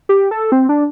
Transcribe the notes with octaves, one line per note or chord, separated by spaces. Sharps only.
G4
A4
C4
D4